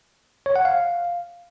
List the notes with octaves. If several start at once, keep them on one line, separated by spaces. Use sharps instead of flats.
C#5
F#5
F5